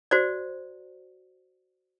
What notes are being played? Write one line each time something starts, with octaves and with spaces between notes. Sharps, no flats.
F#4 C5 D5